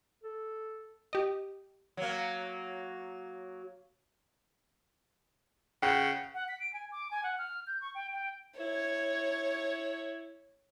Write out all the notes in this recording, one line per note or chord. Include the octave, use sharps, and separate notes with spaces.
A4
G4 D#5
F#3 A#3
C#3 F#5 G5
F#5
B6
D7
G#5
D6
G#5
F#5
F6
G6
C#6
G5
G5
E4 C#5